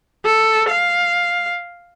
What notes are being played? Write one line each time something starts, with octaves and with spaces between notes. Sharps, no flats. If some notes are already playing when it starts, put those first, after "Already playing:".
A4
F5